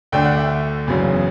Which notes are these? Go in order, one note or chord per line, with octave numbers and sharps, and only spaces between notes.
D2 D3 A3 D4 G5
F#5
E5
F#1 E2 C#3 F#3